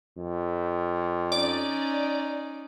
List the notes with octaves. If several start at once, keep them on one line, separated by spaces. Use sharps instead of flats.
F2
C#4 D#4 D5